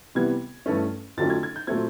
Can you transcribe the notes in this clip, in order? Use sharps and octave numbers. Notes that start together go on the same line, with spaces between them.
C3 E3 G3 B3 G#6
G2 E3 A3 C#4
F2 D3 F#3 A3 C#4 A6
G#6
G#6
G6
A#2 F#3 A3 C4 G#6